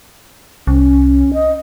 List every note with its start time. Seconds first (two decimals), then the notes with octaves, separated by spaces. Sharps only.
0.67 C2 C#4
1.34 D#5